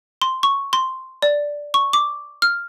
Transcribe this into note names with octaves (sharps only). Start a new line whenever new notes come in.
C6
C#6
C6
D5
C#6
D6
F6